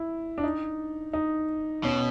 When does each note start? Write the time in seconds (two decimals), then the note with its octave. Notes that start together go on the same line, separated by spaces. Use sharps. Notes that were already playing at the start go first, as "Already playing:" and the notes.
Already playing: E4
0.38 D4
0.44 D#4
1.13 D#4
1.83 B2 C#4